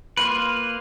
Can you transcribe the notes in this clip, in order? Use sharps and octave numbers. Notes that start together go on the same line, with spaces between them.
A#3 F4 B4